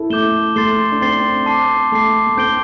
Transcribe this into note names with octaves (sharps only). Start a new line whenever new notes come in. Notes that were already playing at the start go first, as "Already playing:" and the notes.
Already playing: E4 A4
A3 D6 G6 E7 G7
A3 C6 A6 C7 G7
D4
C4 C6 A6 C7 G7
A5 D6 C7
A3 A5 D6 C7
A3
C4 G6 D7 G7